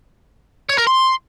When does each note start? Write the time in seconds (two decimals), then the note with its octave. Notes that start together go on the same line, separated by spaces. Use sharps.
0.69 C#5
0.78 A#4
0.87 C6